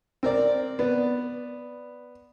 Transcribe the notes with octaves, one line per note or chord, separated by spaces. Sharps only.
C4 A#4 D5
B3 D5